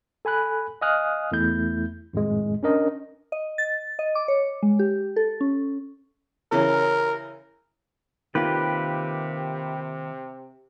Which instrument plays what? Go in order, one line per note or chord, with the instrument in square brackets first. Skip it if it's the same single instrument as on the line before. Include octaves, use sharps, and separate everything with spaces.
[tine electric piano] A4 G#5 B5 F#6
D#5 F5 G#5 D#6 F6 F#6
E2 A3 E4 G6
G#1 F2 A2 G#3
C#4 D4 A#4 D#5
[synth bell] D#5
A6
D#5
D6
C#5
G#3
G4
A4
C#4
[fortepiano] C#3 E3 C#4 [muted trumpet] A#4
[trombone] C3 [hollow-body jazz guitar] D#3 A#3 F4 [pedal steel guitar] G4 B4